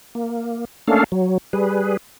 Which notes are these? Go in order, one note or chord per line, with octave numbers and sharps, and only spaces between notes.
A#3
A3 A#3 C#4 D4 A4 F5
F#3
G3 G#4 B4